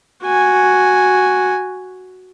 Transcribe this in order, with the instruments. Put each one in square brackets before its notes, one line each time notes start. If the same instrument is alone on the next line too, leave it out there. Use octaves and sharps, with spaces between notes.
[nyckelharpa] F#4 G#5